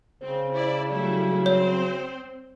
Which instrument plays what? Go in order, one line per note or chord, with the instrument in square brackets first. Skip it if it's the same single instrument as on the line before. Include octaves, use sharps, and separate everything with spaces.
[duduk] C#3 [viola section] C4 [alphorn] C5
[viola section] E4 D5
[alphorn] F#3 [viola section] G3 A3 E4
[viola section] C4 C5 [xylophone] C#5